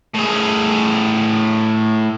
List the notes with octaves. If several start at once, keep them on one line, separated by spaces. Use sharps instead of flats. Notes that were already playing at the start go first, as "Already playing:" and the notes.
A2 G#4